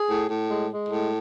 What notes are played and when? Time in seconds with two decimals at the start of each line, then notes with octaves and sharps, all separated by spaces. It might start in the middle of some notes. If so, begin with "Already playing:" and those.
Already playing: G#4
0.09 A2
0.29 A2
0.49 G#3
0.70 G#3
0.90 A2